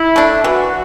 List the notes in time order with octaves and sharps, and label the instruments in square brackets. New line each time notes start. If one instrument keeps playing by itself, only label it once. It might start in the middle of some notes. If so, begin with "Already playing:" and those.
Already playing: [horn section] E4
[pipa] A3 D4
[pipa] E3 [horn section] F#4